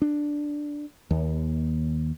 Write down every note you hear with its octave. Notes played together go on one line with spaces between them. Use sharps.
D4
D#2